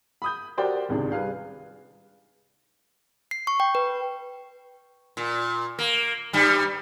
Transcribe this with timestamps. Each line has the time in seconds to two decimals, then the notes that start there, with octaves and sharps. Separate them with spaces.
0.22 B5 D#6 G6
0.58 F#4 G4 A#4 C5 D5 G5
0.89 G#1 C#2 C3 D4 G#4
1.12 G3 G#4 B4 F5
3.31 C7
3.47 C#6
3.60 G5
3.75 B4
5.17 A#2
5.79 A#3
6.33 G2 G3